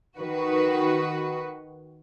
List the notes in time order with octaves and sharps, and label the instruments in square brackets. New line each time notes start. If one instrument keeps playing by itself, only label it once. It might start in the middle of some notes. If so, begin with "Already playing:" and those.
[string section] D#3 F#4 B4